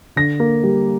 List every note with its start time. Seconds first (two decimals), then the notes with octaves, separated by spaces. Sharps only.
0.16 D3 A#6
0.40 A#3
0.64 G3